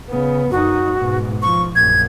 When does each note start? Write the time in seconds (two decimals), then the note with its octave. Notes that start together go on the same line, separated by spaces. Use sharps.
0.10 C#3 B3
0.51 F#2 D#4 F#4
1.00 G#2 B2
1.42 F3 C#6
1.76 A#1 F#2 G#6